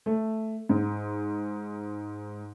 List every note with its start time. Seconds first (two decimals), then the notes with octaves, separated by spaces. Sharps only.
0.06 A3
0.69 G#2